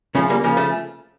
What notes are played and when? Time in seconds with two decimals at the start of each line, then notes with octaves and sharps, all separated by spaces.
0.15 C#3 F3 A3 C#4
0.30 G3 A#3
0.44 C#3 F3 A#3
0.57 A3